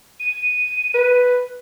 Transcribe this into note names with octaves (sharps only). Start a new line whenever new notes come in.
D#7
B4